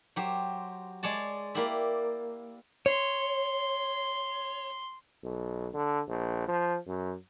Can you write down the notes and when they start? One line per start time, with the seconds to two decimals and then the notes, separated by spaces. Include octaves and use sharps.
0.16 F#3 G4 C5
1.03 G#3 C#5 D5 A5
1.54 A#3 E4 G4 D5 E5
2.86 C#5 C6
5.24 B1
5.74 D3
6.08 A#1
6.48 F3
6.87 F#2